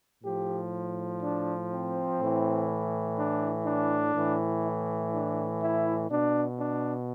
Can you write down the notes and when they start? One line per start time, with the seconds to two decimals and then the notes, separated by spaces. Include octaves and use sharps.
0.23 A2 F3 G4
1.21 D4
1.70 C4
2.19 A2 E3
3.17 D4
3.66 D4
4.15 A2 E3
4.64 E4
5.13 D4
5.62 E4
6.10 B2 D4
6.60 D4